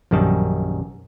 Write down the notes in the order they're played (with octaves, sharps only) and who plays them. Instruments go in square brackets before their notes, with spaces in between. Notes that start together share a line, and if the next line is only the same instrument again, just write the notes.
[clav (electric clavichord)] A#1 F#2 D#3 G3 A5